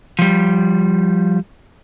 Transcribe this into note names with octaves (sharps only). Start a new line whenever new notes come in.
F3 G3